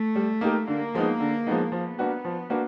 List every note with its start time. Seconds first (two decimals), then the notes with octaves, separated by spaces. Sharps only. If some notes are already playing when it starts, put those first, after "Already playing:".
Already playing: A3
0.16 G3
0.41 A#3 D#4 G4 A#4
0.68 D3 A#3
0.95 F3 G#3 B3 D#4
1.20 D3
1.47 F3 G#3 B3 D#4
1.72 F3 B3
1.98 A#3 D4 F#4 B4
2.25 F3
2.50 A#3 D4 F#4 B4